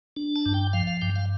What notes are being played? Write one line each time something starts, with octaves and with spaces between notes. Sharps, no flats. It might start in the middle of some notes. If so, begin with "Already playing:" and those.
D4
A5
G2
G5
F3 F5
F5
G2 G5
F5